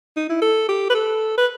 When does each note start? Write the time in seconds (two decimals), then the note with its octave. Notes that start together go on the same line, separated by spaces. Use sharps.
0.17 D#4
0.29 E4
0.42 A4
0.69 G4
0.90 B4
0.94 A4
1.38 B4